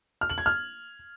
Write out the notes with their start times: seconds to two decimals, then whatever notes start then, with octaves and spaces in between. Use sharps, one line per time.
0.21 F6
0.30 F#7
0.38 G#6
0.46 F6